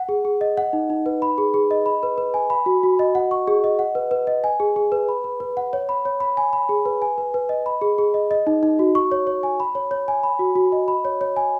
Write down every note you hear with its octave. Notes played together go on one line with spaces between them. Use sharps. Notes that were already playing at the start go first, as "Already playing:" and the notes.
Already playing: F#5
G#4
G#4
D#5
F#5
D#4
D#4
B4
B5
G#4
G#4
D#5
B5
B4
B4
G#5
B5
F#4
F#4
D#5
F#5
C#6
G#4
D#5
F#5
B4
B4
D#5
G#5
G#4
G#4
B4
B5
B4
B4
F#5
C#5
B5
C#5
B5
G#5
B5
G#4
B4
G#5
B4
B4
D#5
B5
G#4
G#4
D#5
D#5
D#4
D#4
F#4
C#6
C#5
C#5
G#5
B5
C#5
C#5
G#5
B5
F#4
F#4
D#5
B5
C#5
C#5
G#5